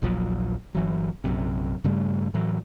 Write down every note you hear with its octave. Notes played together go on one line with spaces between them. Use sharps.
D#1 A#1 F3 F#3
G1 E3 F#3
A#1 F#2 C3
G2 C#3 G3 A3
A2 E3 F#3